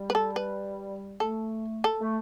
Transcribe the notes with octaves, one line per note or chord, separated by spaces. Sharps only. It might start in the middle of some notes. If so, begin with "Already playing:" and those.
Already playing: G3
B4
A4
B4
A3 A4
A4
A3